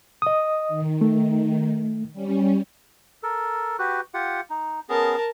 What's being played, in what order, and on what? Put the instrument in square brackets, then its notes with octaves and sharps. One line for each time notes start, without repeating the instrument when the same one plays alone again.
[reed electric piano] D#5 D#6
[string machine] D#3
[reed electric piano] A3
[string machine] G3 C#4
[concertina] A4 A#4
F#4 G4 B4
F4 G4 F#5
D#4
[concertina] B3 C#4 G#4 [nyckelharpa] A#4 A5